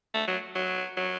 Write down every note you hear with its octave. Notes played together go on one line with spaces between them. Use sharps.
A3
F#3
F#3
F#3